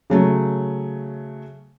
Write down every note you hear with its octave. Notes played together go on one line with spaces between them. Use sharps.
C#3 F#3 A3